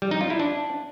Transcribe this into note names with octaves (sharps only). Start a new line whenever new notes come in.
G3
D#4
F4
E4
D4